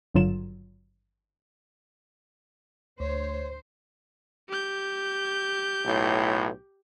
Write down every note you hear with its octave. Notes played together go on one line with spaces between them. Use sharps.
G#1 G2 D3 F#3 F4 E7
D2 C5 C#5
G4 G6
B1 A2